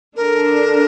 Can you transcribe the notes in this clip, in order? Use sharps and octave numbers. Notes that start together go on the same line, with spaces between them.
D3 D4 A#4